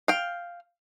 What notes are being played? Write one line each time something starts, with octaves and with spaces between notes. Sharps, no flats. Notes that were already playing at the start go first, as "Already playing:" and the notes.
F5 G5